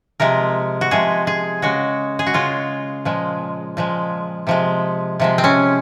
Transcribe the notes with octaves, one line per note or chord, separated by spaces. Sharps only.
C3 F3 G#3 A#4
F#4
C3 F3 G#3 G#4
G#4
C#3 G#3 F#4
G#4
F#4
C#3 G#3 F4
A#2 F3 G#3
A#2 F3 G#3
C3 F3 G#3
C3 F3 G#3
C4
C#4